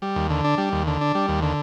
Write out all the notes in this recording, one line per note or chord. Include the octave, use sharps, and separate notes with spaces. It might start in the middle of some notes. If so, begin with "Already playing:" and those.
G3
D#2
D3
D4
G3
D#2
D3
D4
G3
D#2
D3